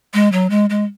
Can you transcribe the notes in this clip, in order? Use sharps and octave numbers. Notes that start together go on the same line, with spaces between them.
G#3
F#3
G#3
G#3